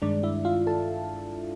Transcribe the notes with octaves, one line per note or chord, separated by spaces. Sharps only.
G2 D#3 G#3 D4 D5
E4 E5
F4 F5
A4 A5